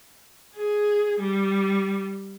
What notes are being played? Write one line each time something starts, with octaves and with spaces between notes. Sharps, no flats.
G#4
G3